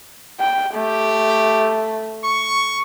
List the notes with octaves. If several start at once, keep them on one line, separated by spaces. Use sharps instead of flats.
G5
A3 G4
C#6